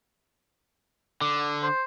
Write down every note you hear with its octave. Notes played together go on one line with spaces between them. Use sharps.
D3
C5